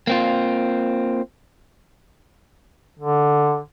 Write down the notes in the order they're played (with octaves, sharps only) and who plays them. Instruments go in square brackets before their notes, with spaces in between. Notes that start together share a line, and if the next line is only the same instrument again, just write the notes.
[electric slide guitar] A#3 C4 F4
[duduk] D3